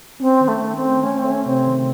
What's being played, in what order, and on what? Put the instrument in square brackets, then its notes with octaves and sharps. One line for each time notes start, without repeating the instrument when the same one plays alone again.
[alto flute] C4 [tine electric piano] C#4
[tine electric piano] D#3
[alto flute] A3
[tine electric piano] D#3
[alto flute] C4
[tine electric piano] C#4
[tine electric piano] A3 [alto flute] C#4
[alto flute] C4
[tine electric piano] A3
[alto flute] C#4
[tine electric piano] C3 [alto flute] C4
[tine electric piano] D#3